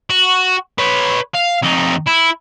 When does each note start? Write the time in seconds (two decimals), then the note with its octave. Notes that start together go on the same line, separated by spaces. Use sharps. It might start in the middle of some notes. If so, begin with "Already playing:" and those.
0.10 F#4
0.78 B4 C#5
1.34 F5
1.62 F2 D#4
2.06 E4